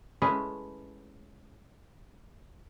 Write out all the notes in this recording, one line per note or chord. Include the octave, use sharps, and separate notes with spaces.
G#3 A3 C#4 E4 G#4 B4